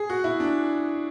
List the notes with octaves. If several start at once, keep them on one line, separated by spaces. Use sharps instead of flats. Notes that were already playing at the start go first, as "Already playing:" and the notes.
Already playing: G#4
F#4
E4
D4